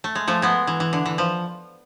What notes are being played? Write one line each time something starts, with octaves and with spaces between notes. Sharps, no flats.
A3
G#3
F3 A3
G#3 B3
E3
E3
D3
E3
F3